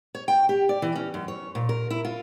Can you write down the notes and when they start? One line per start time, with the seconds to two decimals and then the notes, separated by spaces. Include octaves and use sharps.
0.15 C#5
0.28 G5
0.49 G4
0.69 D5
0.82 E3
0.95 C#4
1.14 F#2
1.28 C#5
1.55 A#2
1.69 A#4
1.90 E4
2.05 F4